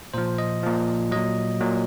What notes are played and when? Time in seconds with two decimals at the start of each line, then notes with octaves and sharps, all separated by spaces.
0.14 A#2 F3 C5
0.38 D#5
0.63 A#2 F3
1.11 A#2 F#3 D#5
1.61 A#2 F#3